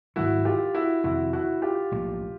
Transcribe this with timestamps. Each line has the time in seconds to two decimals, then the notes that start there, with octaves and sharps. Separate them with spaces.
0.16 G#2 D#3 F#3 A3 E4 F#4
0.45 F4 G4
0.74 E4 F#4
1.04 F2 C3 D#3 E4 F#4
1.33 E4 F#4
1.62 F4 G4
1.91 B1 A2 F3 A#3